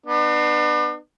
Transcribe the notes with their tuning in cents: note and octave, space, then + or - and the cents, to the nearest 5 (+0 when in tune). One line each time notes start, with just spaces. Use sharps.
B3 +0 D4 +40